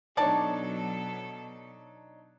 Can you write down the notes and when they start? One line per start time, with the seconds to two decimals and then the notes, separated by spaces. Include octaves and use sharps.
0.17 B2 F#3 D4 D#4 A4 C#5 D5 A5